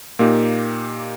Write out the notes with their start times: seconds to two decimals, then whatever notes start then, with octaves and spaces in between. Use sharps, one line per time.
0.19 A#2 A#3 D#4 G4